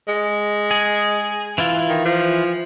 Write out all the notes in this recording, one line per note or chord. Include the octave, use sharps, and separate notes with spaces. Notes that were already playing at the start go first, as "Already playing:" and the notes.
G#3
G#4
E3 E4 F4
D#3
F3